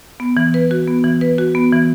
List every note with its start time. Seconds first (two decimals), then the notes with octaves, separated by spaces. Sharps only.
0.20 B3
0.37 E3
0.54 B4
0.71 F#4
0.87 B3
1.04 E3
1.21 B4
1.38 F#4
1.55 B3
1.72 E3